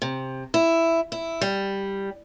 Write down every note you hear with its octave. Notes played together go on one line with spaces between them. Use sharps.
C3
E4
E4
G3